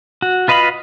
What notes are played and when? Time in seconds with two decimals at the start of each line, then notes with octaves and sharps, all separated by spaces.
0.22 F#4
0.48 F4 B4 D#5 F5 B5